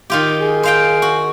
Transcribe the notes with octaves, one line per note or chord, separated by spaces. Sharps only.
D#3 F4 G4
G#4
C5 F5 G5
F#4